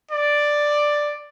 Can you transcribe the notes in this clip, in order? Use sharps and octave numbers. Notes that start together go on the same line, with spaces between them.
D5